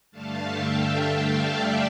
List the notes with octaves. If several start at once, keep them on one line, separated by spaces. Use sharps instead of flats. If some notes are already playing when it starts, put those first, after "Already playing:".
G2 D3 A3 F5 A5
E5 G5
D5 F5